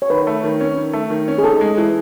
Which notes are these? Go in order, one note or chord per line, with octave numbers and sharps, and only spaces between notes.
C#5
D#3 B4
A3
D#3
C#4
D#3
A3
D#3
C#4
G#4
D#4 A4
G#3
E3